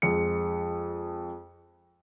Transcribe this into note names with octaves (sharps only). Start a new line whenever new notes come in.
F2 G#3 C#7